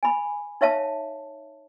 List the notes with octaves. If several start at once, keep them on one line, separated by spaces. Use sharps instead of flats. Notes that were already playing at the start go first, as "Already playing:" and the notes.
G#5 B5
D#4 C#5 E5 F5 A5